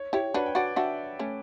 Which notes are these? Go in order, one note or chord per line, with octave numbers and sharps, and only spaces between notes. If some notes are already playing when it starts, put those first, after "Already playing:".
Already playing: C#5
E4 G4 C#5
D4 F#4 B4
G5
D4 F#4 D5 F#5
D4 F#4 E5 G5
A3 C#4